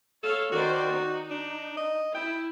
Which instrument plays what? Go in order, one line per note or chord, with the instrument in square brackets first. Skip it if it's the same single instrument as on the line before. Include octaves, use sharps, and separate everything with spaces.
[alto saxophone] A4 [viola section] C#5 F5
[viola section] D#3 C5 D5 [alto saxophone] F#4
[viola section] D#4
[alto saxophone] D4
D#5
[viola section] E4 [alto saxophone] G5